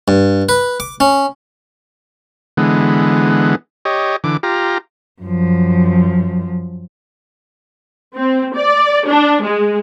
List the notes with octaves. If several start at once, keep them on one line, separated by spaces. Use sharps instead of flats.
G2
B4
D6
C#4
D3 E3 G#3 B3
G4 C#5 D#5
D3 E3 D6
F4 G4 A#5
F#2 F3
C4
D5
D4
G#3